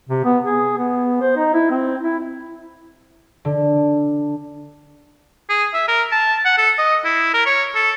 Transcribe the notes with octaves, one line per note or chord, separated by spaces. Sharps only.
C3
B3
G#4
B3
C5
D#4
E4
C4
E4
D3
G#4
E5
A#4
A5
F#5
A4
D#5
E4
A#4
C#5
A4